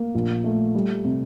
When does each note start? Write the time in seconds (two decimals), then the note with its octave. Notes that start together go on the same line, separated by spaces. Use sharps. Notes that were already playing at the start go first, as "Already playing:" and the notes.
Already playing: A#3
0.15 A#1
0.44 A3
0.75 G3
1.05 C3